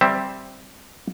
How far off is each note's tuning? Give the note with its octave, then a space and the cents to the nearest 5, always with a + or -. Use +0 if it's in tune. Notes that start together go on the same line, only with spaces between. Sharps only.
G3 +0 C4 +5 E5 +0